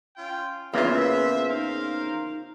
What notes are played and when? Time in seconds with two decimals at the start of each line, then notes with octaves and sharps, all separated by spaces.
0.17 C#4 F4 G5
0.74 E2 C#3 A#3 F4 B4 C5 E5
1.50 D#4 A#4 C5 F5